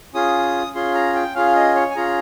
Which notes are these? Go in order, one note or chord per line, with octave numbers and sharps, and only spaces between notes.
C#4 F4 G#4 D#6
C#4 F4 G#4 C6
A#5
G5
C#4 F4 G#4 F5
D#5
C#5
G#5
C#4 F4 G#4 A#5